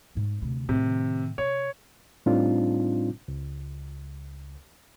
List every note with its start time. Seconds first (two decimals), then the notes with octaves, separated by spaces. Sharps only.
0.15 G#2 B3
0.42 D2 C3
0.69 A2 C3 D#3
1.38 C3 C#5
2.26 A2 G3 C4 D4 D#4 F4
3.28 C#2